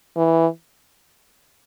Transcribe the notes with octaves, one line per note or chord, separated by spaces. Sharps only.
E3